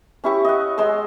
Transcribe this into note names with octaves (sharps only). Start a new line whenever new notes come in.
C#4 E4 G4 C#6
D#5 F#5
G#3 D#5 C6 E6